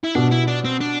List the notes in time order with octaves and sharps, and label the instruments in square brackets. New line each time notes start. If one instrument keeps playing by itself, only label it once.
[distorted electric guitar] E4
[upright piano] B2 [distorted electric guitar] D4
[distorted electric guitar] E4
D4
C4
D4